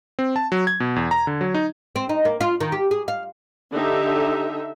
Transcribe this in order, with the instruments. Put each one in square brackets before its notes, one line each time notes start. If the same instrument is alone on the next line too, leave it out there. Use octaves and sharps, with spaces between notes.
[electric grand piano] C4
A5
F#3
G#6
B2
E2
A#5
D3
F#3
D#4
[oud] C4
D#4
A#3
F4
D#3
G4
G#4
F5
[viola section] D3 D#4 G4 E5